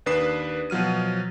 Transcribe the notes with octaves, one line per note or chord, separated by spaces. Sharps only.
D#2 D4 B4 D#6 C7 E7
B2 F3 F#3 F6 D#7